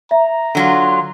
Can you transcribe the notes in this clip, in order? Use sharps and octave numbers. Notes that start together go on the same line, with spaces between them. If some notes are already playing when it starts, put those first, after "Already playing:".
E5 A#5
D3 F#3 F4